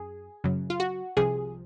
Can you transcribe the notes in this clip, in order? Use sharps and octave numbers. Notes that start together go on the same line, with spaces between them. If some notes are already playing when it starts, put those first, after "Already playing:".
Already playing: F#2 G#4
F#2 C#3 F#3
F4
F#4
C2 C3 F3 G#4